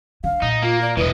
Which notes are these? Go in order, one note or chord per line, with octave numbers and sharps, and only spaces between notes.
D3 F5
A#2 D#4
A#3 F4
D5
E1 E3 B4 D#5